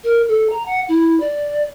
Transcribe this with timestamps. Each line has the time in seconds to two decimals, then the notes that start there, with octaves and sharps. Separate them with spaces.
0.04 A#4
0.28 A4
0.50 A#5
0.66 F#5
0.88 E4
1.20 D5